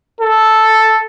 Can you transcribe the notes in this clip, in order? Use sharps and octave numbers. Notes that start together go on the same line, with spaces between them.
A4